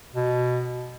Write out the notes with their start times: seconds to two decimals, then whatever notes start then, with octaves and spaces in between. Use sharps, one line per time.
0.15 B2